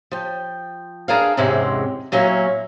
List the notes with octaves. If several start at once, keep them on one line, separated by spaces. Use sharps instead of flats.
F3 G5
D4 G#4 A#4 B4 F5
E2 G#2 C3 G#3 C4 C#4
A#2 F#3 A#3 C#4 E4